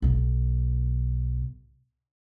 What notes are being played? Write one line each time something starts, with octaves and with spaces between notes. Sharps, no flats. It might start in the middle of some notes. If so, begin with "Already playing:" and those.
B1 B2